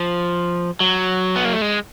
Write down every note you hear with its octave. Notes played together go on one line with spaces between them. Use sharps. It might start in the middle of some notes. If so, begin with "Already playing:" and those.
Already playing: F3
F#3
B3
A#3
A3
G#3